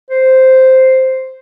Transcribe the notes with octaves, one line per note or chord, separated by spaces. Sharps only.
C5